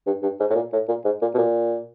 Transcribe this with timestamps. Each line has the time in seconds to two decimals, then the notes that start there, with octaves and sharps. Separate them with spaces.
0.07 G2
0.23 G2
0.40 G#2
0.50 A2
0.55 A#2
0.73 A2
0.88 A#2
1.05 G#2
1.22 A#2
1.34 B2
1.38 A#2